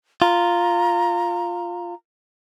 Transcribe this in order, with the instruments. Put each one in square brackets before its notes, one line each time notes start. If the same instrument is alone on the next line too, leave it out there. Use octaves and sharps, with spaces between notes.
[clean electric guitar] F4 [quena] A#5